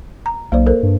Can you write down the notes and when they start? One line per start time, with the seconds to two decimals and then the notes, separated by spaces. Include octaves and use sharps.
0.26 A#5
0.52 B1 A#3 C5 D5
0.66 A4 A#4 C5
0.83 G2